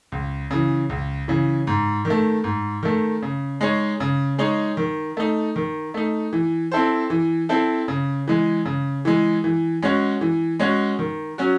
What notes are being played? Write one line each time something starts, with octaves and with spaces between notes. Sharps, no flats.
C#2
C#3 E3
C#2
C#3 E3
G#2
D#3
A3
G#2
D#3 A3
C#3
G#3 D#4 G#4 C#5
C#3
G#3 D#4 G#4 C#5
D#3
A3 D#4
D#3
A3 D#4
E3
C4 E4 A4 C5
E3
C4 E4 A4 C5
C#3
E3 G#3
C#3
E3 G#3
E3
G#3 C#4 F#4 C#5
E3
G#3 C#4 F#4 C#5
D#3
F#3 C#4 F#4